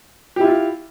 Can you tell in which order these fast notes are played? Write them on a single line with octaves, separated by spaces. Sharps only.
G4 E4 F4